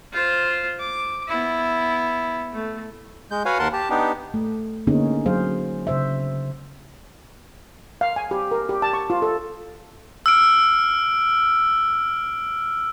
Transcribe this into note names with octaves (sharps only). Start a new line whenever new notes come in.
F4 C5
D6
B3 E4
A3
G#3 G6
F#4 B4 C#5 F5 F#5 G#5
D#2 A#4 F#5 A5 C6
G4 A5
B3 D4 D#4 G4
A3
D3 A#3 B3 C#4 D#4 G#4
F#3 G#4 C5 F5
C#3 C5 E5
F5
G#5
G4
A#4
G4
A5
C#6
F4
A4
E6 F6 D7